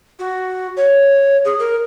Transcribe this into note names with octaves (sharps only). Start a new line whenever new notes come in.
F#4
C#5
G#4
A#4